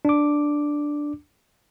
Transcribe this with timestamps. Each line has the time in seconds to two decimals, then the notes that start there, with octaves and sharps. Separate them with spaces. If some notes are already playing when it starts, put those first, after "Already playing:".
0.05 D4 D6